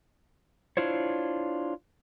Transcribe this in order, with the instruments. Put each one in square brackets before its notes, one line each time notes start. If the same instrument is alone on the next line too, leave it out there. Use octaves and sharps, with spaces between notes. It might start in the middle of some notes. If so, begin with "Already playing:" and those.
[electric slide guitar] D4 E4 F4 C5 C#5